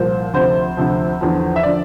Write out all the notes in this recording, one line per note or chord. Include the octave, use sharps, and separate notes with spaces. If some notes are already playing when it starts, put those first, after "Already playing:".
Already playing: C2 A#2 F3 C5
D2 C3 F3 C5
D2 C3 F3
E2 D3 F3
E5
D3 F3 D5